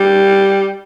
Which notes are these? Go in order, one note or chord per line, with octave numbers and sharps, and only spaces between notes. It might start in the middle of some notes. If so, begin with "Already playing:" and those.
Already playing: G3